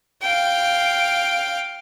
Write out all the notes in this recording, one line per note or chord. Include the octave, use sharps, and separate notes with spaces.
F5 G5